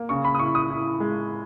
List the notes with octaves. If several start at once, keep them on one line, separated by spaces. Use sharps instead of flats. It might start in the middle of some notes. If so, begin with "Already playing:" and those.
Already playing: A#3
C#3 C#6
B5
D#6
E4 C#6
D#6
E4
G#3